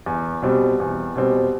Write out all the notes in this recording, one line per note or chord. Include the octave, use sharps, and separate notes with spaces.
E2
B2 G3 C4
E2
B2 G3 C4